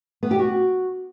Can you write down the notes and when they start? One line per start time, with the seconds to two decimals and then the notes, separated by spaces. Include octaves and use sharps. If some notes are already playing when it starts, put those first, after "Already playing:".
0.23 B3
0.31 G4
0.39 F#4